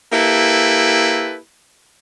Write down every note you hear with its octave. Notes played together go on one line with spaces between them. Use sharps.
A#3 E4 G4 A4 B4